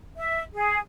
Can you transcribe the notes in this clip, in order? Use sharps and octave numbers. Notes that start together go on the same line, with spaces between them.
E5
G#4